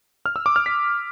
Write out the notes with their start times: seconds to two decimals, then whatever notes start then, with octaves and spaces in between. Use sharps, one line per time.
0.26 F6
0.36 E6
0.46 D6
0.56 F6
0.66 B6